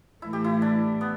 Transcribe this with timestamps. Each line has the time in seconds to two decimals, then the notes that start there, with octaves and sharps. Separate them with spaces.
0.22 A2 E3 A3 E4
0.33 G4
0.44 E4
0.62 D4
1.01 B3